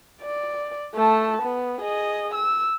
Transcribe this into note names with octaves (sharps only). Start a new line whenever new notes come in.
D5
A3 A5
B3
G#4 D#5
E6